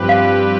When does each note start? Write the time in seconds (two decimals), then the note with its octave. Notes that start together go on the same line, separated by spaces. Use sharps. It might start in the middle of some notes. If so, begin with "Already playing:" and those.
Already playing: G2 F3 C4 G4 B4
0.09 F5